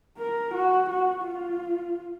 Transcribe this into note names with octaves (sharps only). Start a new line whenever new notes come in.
A#4
F#4
F#4
F4